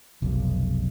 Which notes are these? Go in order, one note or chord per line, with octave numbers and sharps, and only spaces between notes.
F1 B1